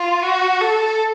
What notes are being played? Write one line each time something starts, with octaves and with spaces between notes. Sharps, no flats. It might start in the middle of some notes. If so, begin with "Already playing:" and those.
Already playing: F4
F#4
A4